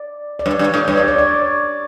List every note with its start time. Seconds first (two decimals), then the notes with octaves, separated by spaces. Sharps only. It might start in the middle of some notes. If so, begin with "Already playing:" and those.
Already playing: D5
0.39 D5
0.46 G2 C#5
0.59 G2
0.74 A2
0.88 G2 C#5
0.97 D5
1.08 C#5
1.18 D5